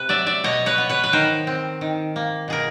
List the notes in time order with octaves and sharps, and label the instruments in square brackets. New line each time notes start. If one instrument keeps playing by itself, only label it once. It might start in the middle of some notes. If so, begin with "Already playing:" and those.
Already playing: [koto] C3 B4
F#3 D5 E5
D5 E5
B2 C#5 D#5
B4 C#5
B3
B4 C#5
B4
D#3 A#4 C5
C4
D#3
A#3
B2 G#4 A#4